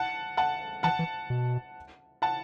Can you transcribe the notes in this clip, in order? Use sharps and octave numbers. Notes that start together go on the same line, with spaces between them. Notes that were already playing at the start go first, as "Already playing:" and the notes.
Already playing: F#5 A5
F#5 A5
E3 F#5 A5
E3
B2
F#5 A5